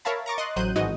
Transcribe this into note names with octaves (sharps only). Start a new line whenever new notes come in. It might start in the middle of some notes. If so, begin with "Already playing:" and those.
A#4 C#5 E5 F5 A5 B5
A#5 C#6 D6 A6
D#5 C6 F#6
A1 F#3 C5 F#6 G6 D#7
G#1 E3 G#3 D#4 F#4 D#5